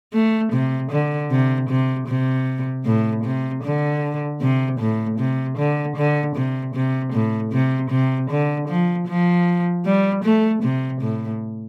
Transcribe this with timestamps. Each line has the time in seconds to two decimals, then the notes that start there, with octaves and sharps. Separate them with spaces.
0.13 A3
0.53 C3
0.91 D3
1.31 C3
1.69 C3
2.08 C3
2.86 A2
3.24 C3
3.63 D3
4.41 C3
4.80 A2
5.19 C3
5.58 D3
5.96 D3
6.36 C3
6.75 C3
7.13 A2
7.52 C3
7.91 C3
8.30 D3
8.68 F3
9.07 F3
9.85 G3
10.24 A3
10.63 C3
11.01 A2